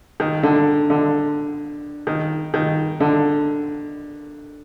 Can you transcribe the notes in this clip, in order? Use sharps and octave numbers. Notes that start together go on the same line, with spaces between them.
D#3
D3
D3
D#3
D#3
D3